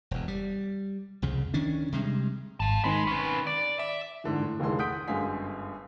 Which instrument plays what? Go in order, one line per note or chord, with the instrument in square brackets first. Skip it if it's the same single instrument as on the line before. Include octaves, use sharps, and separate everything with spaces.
[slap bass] E1 E2
G3
C2 F2 C#3
D#3 C#4 D4
C3 G3 G#3
[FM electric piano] G#1 [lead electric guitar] F5 A5
[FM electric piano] D#3 C4 B5 [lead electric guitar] G#3
[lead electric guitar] C#4 B4
D5
[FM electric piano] D5 [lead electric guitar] E5
[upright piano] G#2 D3 E3
A2
F1 D#2 D3 E3 G#3 C6
F#5 D#6 G6 B6 D7
G1 F#2 G#3 F5 G#5 B6